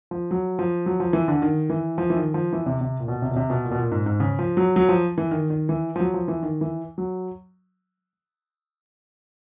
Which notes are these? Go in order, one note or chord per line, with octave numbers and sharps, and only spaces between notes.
F3
F#3
F3
F#3
F3
E3
D3
D#3
E3
F3
E3
D#3
F3
E3
C3
C3
A#2
B2
C3
B2
C3
B2
A#2
B2
A#2
G#2
G#2
C#3
F3
F#3
F#3
F3
E3
D#3
D#3
E3
F3
F#3
F3
E3
D#3
E3
F#3